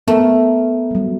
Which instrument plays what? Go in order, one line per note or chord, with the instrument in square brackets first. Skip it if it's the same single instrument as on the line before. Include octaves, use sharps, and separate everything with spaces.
[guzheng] A3 [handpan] B3 A#4
[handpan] F#3 G3